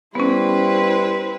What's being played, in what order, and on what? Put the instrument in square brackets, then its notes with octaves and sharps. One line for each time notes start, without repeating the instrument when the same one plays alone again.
[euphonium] G3 [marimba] B3 C#4 [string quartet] E4 B4 C5